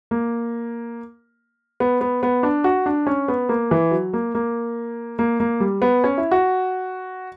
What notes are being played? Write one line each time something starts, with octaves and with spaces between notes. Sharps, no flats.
A#3
B3
B3
B3
D4
F#4
D4
C#4
B3
A#3
E3
F#3
A#3
A#3
A#3
A#3
G3
B3
C#4
E4
F#4